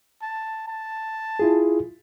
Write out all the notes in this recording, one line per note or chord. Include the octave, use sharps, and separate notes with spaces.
A5
A5
E4 F4 G#4